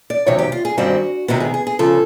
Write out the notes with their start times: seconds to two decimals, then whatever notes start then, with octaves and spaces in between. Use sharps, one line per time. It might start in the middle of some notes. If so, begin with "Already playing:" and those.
0.10 D5
0.26 E2 C3 D#3 F#3 C#5
0.39 G4
0.52 F4
0.65 G#4
0.78 G2 D#3 G3 C4 F#4
1.28 C3 D#3 G#3 B3 F#4
1.40 G#4
1.54 G#4
1.67 G#4
1.79 C#3 F3 A4